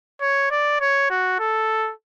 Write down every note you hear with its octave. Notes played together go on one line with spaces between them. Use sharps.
C#5
D5
C#5
F#4
A4